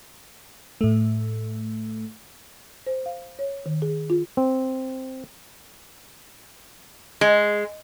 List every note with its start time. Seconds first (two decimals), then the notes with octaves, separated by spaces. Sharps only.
0.81 A2 A3
2.87 C5
3.06 F5
3.39 C#5
3.66 D#3
3.82 G#4
4.10 F4
4.37 C4
7.21 G#3